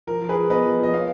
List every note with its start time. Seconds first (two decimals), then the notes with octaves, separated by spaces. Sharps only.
0.07 F3 A#4
0.22 F3
0.29 G#4 B4
0.37 F3
0.50 B3 B4 D#5
0.65 F3
0.79 F3 D#5
0.93 B3 C#5 F5